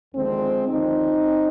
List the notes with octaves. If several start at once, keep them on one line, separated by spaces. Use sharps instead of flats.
D#2 D3 F3 G#3 C4
D#2 D3 F3 C4 D#4